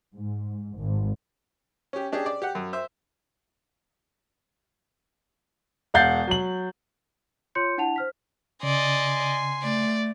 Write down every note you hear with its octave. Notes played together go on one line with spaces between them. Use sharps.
G#2
G#1
C#4 G4
C#4 D4 G4 G#4
D5
G4 F#5
F#2
C5 E5
E1 F5 F#5 G6 A6 C7
F#3 F#7
F4 C#5 C6 G6 C#7
D4 E4 F#5 A5 F7
C5 F6 B6
C#3 D5 D#5 G#5 C6
A3 D5